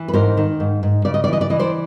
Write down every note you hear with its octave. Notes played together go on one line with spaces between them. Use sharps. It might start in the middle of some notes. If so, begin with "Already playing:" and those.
Already playing: E3
B4
G#2 A#4 C5
D#3
G#2
G#2
C#3 D5
D#5
D5
E3 D#5
D5
E3 D#5
C5 D5